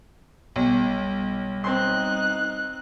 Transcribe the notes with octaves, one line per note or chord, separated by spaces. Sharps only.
B1 G3
C4 D#4 C6 F#6